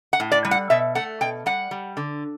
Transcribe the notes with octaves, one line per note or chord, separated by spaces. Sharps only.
F#5
A2
D5
G3
F#5
B2 E5
A3 F#5
B2 G5
G3 F#5
G3
D3